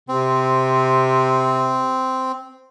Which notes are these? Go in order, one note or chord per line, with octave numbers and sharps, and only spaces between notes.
C3 C4